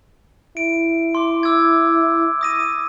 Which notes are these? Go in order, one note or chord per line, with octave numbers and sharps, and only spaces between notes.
E4 D7
C6 D6
D6 E6 G#6
D#6 A#6 D#7